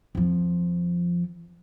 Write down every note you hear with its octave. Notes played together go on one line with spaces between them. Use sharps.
F2 F3